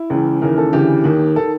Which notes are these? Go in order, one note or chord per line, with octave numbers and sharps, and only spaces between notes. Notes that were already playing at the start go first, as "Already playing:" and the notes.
Already playing: E4
C#2 C#3 E3
D#2 C#3 E3 A#4
A4
D2 C#3 E3 G4
D#2 D#3
D#3 A4